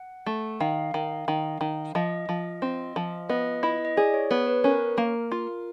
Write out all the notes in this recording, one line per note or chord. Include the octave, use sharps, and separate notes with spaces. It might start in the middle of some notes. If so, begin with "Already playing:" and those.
Already playing: F#5
A3
D#3 F5
D#3
D#3
D#3
F3 D#5
F3
C4
F3
B3 D#5
E4 D#5
D#5
G#4 D5
C#5
B3 C#5
B4
C#4 A#4
A#3
F4